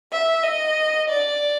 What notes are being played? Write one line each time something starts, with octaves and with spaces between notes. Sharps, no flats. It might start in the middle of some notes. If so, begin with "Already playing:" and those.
E5
D#5
D5